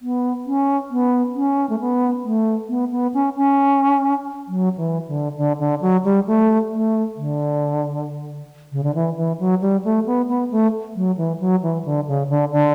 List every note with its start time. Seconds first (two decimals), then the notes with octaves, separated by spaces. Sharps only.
0.02 B3
0.46 C#4
0.91 B3
1.35 C#4
1.70 A3
1.80 B3
2.24 A3
2.69 B3
2.92 B3
3.14 C#4
3.36 C#4
4.48 F#3
4.77 E3
5.08 D3
5.37 D3
5.59 D3
5.81 F#3
6.04 G3
6.27 A3
6.71 A3
7.16 D3
8.72 C#3
8.84 D3
8.95 E3
9.17 E3
9.39 F#3
9.61 G3
9.84 A3
10.06 B3
10.29 B3
10.51 A3
10.96 F#3
11.17 E3
11.40 F#3
11.63 E3
11.85 D3
12.07 C#3
12.29 D3
12.52 D3